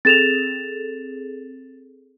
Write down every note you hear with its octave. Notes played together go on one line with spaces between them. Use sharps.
C4 G#4 A4 A6 E7 F7